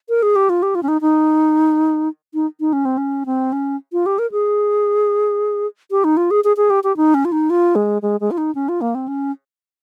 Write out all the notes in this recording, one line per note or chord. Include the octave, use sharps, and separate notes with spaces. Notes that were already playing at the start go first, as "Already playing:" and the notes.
A#4
G#4
G4
F4
G4
F4
C#4
D#4
D#4
D#4
D#4
C#4
C4
C#4
C4
C#4
F4
G4
A#4
G#4
G4
D#4
F4
G#4
G#4
G#4
G4
G4
D#4
C#4
F4
D#4
F4
G#3
G#3
G#3
F4
D#4
C#4
F4
A#3
C4
C#4